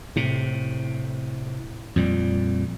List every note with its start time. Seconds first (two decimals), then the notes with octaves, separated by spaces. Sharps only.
0.16 A2 C3
1.96 F2 A#2 G3